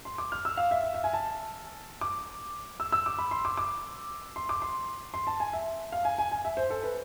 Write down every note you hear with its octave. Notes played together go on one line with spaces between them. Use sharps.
C6
D6
F6
E6
F5
E5
F5
E5
G#5
A5
D6
E6
E6
D6
B5
C6
D6
D6
C6
D6
C6
C6
A5
G#5
E5
F5
G#5
G#5
G#5
E5
C5
A4
B4